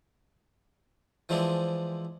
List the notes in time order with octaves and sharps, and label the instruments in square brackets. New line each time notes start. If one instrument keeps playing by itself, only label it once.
[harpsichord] E3 F3 G#3 C4 D4 E4